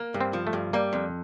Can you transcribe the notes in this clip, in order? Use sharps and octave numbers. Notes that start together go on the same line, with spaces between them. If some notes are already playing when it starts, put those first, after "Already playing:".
Already playing: A#3
G2
C4
F3
A3
G2
G3 A#3
F2